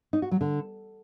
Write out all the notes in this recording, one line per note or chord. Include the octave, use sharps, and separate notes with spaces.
D#4
F#4
F#3
D3